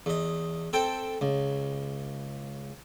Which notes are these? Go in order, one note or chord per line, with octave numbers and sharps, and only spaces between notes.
E2 D#5
C4 A4 G5
C#2